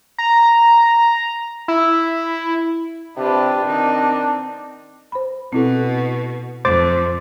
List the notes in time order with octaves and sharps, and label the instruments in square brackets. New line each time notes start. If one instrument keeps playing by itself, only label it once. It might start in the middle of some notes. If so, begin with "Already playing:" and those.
[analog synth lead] A#5
E4
[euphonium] C3 [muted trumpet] D4 [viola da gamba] F4 G4 B4
[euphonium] D#3 [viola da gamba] C4 D#4
[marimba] C5 B5
[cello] B2 [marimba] C4 E4 A4
[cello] F2 [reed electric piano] C5 D6 A6